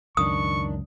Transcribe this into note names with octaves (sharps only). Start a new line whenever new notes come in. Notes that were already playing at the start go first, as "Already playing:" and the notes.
C#2 F#2 D#3 D4 C#6 D#6